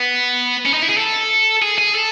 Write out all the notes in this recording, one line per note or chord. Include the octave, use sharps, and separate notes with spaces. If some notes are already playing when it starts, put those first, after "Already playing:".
Already playing: B3
C#4
D#4
E4
G#4
A4
G#4
G#4
A4